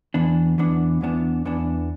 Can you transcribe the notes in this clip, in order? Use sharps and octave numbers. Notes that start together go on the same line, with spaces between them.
E2 E3 B3 D4
E2 E3 B3 D4
E2 E3 B3 D4
E2 E3 B3 D4